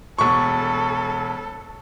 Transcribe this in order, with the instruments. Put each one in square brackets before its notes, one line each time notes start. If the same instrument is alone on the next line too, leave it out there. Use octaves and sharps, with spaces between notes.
[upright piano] E1 C#6 [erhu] A4